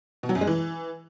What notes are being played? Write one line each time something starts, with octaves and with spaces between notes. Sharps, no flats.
B2
F#3
F#2
G#3
E3